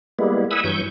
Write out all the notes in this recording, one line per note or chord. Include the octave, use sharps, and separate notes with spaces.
G3 G#3 A#3 B3 E4
E5 F#5 G#5 B5 D#6 E6
G2 E3 F#3 C#6 G6